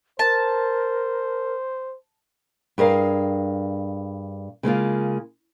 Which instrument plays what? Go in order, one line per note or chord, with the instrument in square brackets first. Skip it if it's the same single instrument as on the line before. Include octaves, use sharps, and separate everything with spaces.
[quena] A#4 [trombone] C5 [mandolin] A5
[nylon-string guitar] G2 G#4 A#4 F5
C#3 G#3 A#3 F4